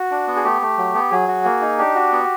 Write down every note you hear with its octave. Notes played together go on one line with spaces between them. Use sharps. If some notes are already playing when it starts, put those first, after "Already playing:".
Already playing: F#4
D4
B3
G#4
A3 G4
A3
F#3
B3
F#3 G#4
F#4
A#3
D#4
D4 G4
F#4
B3